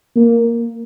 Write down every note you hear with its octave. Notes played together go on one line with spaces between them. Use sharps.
A#3